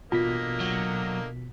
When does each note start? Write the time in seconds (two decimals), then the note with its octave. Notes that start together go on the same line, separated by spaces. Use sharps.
0.12 A1 B2 D3 A#3 F4 D#5 B6
0.60 F#3